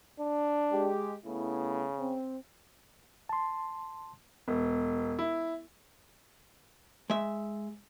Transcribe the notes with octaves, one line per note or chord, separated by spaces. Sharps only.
D4
G#3 G4
C#3 A3 B3 E4
C4
A5 C6
E1 B3
E4
G#3 E5